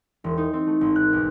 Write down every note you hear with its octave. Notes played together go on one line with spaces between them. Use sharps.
E1
D#4
C4
A3
G#1
F#6
B1